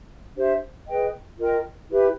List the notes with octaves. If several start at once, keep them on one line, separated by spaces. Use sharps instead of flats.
D4 G4 C5 E5
G#4 B4 D#5 G5
F4 A#4 D#5 G5
E4 G4 B4 E5